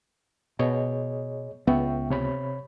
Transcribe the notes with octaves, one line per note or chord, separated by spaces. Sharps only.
B2 G#4 C#5 D#5
C#2 B3 E5 G5 C#6
C3 C#5 B5